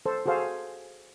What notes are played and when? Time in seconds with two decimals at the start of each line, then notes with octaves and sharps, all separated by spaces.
0.06 A4 C5
0.26 F#4 G#4 A4 C5 F5